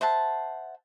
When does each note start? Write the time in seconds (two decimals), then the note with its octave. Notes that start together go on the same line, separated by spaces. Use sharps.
0.01 C5 E5 F#5 A5